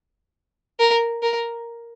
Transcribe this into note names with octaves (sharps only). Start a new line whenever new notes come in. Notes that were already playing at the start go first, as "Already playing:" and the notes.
A#4
A#4